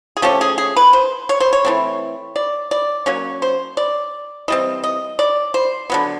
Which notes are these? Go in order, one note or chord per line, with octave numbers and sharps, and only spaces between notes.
G#4
F3 A3 C#4 G4
G#4
G#4
B4
C5
C#5
C5
C#5
E3 A3 C4
D5
D5
F#3 A#3 C#4 C#5
C5
D5
E3 G3 C4 D#5
D#5
D5
C5
D3 F#3 B3